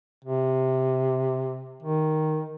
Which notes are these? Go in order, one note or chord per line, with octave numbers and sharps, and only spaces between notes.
C3
D#3